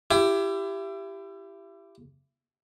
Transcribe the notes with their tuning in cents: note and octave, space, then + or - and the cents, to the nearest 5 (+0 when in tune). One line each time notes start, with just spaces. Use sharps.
E4 +30 G4 +0